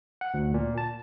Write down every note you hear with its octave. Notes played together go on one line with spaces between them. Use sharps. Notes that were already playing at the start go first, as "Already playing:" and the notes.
F#5
D2
A#2
A5